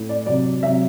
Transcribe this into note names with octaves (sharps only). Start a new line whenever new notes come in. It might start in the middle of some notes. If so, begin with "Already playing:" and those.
Already playing: A2
D5
C3 F#3 D5
C3 F#3 E5